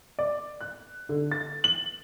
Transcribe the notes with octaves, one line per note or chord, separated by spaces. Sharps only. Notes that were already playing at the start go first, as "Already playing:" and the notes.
D5
F#6
D3
A6
F#7